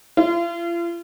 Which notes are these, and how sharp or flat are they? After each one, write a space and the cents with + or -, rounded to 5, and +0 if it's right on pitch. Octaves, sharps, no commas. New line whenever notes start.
F4 -40